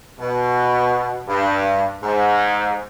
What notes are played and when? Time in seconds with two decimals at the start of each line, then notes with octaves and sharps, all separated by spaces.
0.20 B2
1.28 G2
2.03 G#2